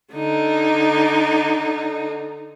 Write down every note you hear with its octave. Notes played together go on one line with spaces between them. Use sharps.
D3 D#4